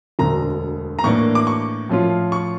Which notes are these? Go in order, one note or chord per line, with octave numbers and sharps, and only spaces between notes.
E1 D2 D3 A#5
A#5
A2 E3 A#3 D4 C#6
D6
C#6
A2 F3 C#4 F4
C#6